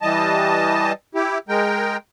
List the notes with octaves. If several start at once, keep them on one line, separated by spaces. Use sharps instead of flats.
E3 G3 D#5 A5
E4 G4
G#3 A#4 G5